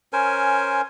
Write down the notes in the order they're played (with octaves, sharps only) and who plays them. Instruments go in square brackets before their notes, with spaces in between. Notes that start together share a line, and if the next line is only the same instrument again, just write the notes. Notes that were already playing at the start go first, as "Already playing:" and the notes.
[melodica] C#4 A#4 C5 G#5